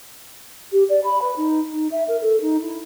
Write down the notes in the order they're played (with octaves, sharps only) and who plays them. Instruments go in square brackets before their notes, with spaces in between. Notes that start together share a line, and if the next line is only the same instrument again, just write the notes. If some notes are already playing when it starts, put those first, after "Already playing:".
[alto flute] G4
D5
B5
B4
D#4
D#4
E5
A#4
A4
D#4
E4